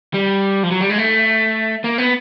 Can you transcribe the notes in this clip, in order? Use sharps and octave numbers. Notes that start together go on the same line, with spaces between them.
G3
F3
F#3
G3
G#3
A3
A#3
B3